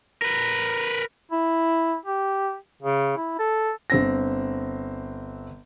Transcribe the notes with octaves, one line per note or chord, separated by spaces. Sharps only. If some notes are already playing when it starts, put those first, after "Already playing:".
A#4 B4
E4
G4
C#3
E4
A4
G1 C4 A#6